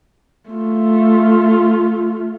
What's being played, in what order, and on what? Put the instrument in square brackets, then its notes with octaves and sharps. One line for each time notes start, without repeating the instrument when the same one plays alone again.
[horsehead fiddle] A3 F4